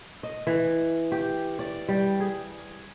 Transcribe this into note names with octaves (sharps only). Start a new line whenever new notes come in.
D#5
E3
G4
D5
G3
G#4